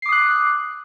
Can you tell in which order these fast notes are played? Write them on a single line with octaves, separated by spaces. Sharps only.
C7 D6 D#6 F#6